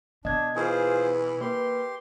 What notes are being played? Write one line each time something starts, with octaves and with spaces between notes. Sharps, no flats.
B2 D4 D#5 G#6
E3 F4 G#4 B4 C5 G#5
A#3 G4 B4 C6